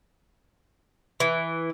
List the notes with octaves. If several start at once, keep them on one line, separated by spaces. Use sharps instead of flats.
E3